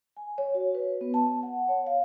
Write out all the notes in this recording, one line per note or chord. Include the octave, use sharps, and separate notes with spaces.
G#5
C#5
F#4
B4
B3
A5
F#5
C#5
F5